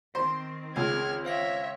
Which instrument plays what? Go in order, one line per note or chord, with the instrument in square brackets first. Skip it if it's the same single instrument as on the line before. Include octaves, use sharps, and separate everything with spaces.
[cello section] D#3 C4 [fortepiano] C5
[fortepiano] C#2 [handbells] G#4 G#5 C7 [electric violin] F6 G#6
[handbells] C5 F5 A#6 [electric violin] C#5 E5